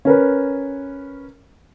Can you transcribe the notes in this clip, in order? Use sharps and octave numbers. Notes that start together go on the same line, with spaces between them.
C#4 A#4 B4